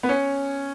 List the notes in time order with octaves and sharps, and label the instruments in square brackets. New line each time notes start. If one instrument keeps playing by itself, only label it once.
[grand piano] B3
C#4